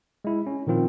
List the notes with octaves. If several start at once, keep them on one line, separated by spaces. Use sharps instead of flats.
G#3 E4
C#4
A#2 D#3 F3 C4 F4